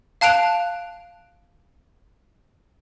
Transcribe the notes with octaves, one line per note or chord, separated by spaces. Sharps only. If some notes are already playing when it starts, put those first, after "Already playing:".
F5 A5 F#6 D7 F7